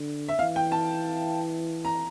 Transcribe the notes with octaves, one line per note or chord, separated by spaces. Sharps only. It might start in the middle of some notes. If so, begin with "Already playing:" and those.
Already playing: D3
E5
E3 F5
G5
A5
A#5